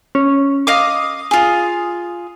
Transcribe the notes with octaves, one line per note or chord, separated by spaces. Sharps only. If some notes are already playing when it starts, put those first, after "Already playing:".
C#4
D#5 F5 D6 D#6
F4 G#4